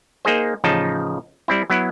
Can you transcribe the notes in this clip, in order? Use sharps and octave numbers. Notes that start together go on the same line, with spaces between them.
A#3 D#4 G#4 C5
A1 C#3 F3 D#4 A5
G3 C4 E4
F#3 B3 E4